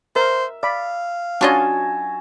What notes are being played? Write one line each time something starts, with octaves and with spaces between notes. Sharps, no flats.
A#4 C5 E5
D5 F5 B5
F#3 C#4 D4 F4 C#5 D#5 G#5 A5